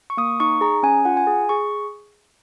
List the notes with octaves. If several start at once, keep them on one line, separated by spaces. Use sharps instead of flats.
C#6
A#3 D#6
D#4 C#6
G#4 A#5
C#4 G#5
F4 F#5
G#5
G#4
G#4 C#6